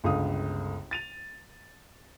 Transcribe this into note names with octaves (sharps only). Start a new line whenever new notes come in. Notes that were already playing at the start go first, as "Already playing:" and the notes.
G1 C#2 D3 F5 D#6
A6 D#7 F7